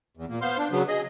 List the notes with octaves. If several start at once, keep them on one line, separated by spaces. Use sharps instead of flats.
E2
A#2 A#3
B3 C5 F5 C6
D4
C#3 F#3 B3
G#4 D#5